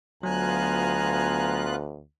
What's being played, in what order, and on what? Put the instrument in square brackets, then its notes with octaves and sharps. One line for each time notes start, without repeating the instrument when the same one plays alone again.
[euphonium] D2 [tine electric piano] F#3 [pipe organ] B3 F4 F#6 [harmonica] G#5 A#5